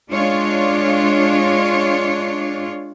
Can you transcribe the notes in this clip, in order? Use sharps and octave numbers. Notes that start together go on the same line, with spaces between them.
G#3 D4 F4 C#5